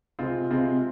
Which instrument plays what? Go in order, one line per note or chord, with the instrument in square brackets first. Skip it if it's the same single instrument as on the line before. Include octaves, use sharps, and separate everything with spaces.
[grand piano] C3 G#3 C4 F4
C3 G#3 C4 F4